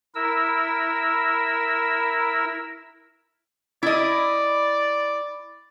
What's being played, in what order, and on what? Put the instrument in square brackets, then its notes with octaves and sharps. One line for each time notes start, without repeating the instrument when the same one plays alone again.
[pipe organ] E4 A#4 E6
[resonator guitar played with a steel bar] E4 D#5 [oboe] D5